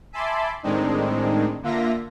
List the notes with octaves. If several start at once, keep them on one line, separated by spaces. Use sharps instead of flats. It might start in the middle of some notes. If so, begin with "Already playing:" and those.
E5 G#5 A5 B5 C6 D6
A2 D#3 G#3 C4 D4 D#4
D3 A#3 F4 E5 A#6